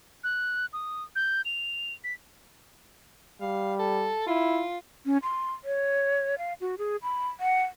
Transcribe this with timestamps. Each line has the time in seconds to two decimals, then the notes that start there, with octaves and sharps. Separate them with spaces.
0.24 F#6
0.73 D#6
1.16 G6
1.45 F7
2.04 B6
3.41 G3 F5
3.79 A4
4.27 E4 F4
5.06 C#4
5.23 C6
5.64 C#5
6.38 F5
6.61 F#4
6.78 G#4
7.03 B5
7.40 F#5